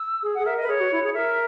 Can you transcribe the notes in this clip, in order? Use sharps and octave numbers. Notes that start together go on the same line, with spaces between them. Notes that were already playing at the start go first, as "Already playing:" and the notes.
Already playing: E6
G#4
G#4 F#5
A#4 E5
D#5
B4
G#4 C#5
F#4
E4
G#4
A#4 E5